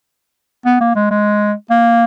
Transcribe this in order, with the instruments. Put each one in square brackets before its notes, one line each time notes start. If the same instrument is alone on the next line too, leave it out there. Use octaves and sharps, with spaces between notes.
[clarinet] B3
A#3
G#3
G#3
A#3